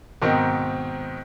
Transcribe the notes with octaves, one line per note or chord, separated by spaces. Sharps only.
G#2 B2 D#3 C4 D#4